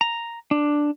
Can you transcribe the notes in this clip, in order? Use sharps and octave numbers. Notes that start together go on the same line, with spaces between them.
A#5
D4